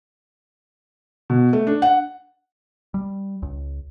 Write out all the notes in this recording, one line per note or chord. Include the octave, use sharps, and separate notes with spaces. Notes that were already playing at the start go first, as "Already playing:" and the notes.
B2
A3
D4
F#5
G3
C#2